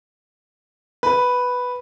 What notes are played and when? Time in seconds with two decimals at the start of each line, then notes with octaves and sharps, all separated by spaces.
1.03 B4